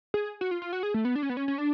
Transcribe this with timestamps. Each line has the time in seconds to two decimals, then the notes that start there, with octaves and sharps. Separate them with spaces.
0.14 G#4
0.41 F#4
0.51 F4
0.62 F4
0.73 F#4
0.83 G#4
0.94 A3
1.05 B3
1.16 D4
1.23 C#4
1.30 B3
1.37 C#4
1.48 C#4
1.58 D4